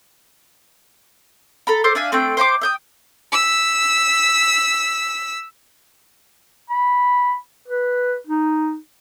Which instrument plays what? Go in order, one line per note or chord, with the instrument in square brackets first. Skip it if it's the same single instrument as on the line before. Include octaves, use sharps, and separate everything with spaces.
[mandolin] A4 A#5 B5
A4 C5 C6 D6
D4 E5 F5 G#5
A3 C4 D4 G5
C5 G5 B5 D6
E5 G5 D#6
[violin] E6 B6
[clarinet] B5
B4
D#4